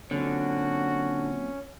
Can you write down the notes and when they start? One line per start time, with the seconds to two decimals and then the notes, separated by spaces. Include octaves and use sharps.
0.11 A#2 D3 F#3 C4 C#4 F#4